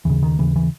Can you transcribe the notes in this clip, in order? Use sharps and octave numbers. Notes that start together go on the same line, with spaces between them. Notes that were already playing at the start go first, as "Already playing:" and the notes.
D#2 C#3 E3
D#3
D#2 C#3 E3
E3